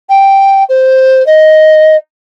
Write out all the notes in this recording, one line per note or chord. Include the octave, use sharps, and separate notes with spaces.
G5
C5
D#5